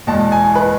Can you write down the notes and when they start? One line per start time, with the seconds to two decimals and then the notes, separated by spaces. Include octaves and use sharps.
0.07 E2 B2 G#3 A5
0.32 G#5
0.55 B4